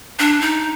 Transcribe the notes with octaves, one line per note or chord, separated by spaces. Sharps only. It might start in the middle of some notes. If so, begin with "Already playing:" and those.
D4
D#4